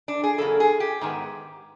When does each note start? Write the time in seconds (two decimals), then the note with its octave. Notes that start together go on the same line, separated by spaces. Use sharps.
0.08 D4
0.24 G#4
0.38 E2 C#3 F#3 A#3 A4
0.60 G#4
0.80 G4
1.01 G#2 D#3 G#3 B3